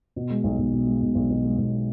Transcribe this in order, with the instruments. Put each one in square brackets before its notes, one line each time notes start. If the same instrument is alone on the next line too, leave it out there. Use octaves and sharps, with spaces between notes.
[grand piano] B2
G#3
B1
B1
B2
G#3
B1
B1
B2
G#3
B1